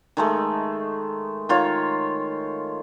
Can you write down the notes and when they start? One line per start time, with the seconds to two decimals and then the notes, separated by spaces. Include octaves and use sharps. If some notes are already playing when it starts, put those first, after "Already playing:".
0.17 D#3 G#3 A3
1.49 D#3 F4 C#5